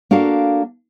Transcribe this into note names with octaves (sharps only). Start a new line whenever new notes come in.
A#3 D4 F#4 A4 F5